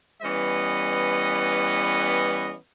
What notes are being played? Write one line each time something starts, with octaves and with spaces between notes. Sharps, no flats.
E3 G3 B3 C#4 B4 D#5